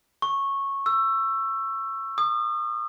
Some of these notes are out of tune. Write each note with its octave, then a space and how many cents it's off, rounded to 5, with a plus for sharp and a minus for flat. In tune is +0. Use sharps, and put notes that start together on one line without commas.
C#6 -10
E6 +20
D#6 -35